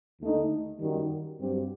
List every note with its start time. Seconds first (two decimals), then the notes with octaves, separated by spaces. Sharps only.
0.21 D#2 D3 A3 D#4
0.79 F#2 D#3 G3
1.39 G2 F#3 C4 G4